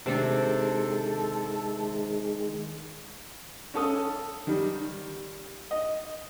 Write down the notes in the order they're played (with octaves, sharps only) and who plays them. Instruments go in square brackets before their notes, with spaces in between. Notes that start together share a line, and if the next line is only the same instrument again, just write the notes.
[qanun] C3 D4 [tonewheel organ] D#3 G#3 [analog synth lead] A4
[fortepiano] C#4 A4 D#6
D#3 G3
D#5